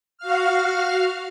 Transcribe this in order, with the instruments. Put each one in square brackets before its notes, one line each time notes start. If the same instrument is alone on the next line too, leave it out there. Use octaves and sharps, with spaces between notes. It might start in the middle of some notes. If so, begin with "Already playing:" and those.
[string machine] F#4 F5 F6